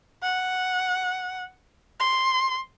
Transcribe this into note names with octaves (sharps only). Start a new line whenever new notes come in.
F#5
C6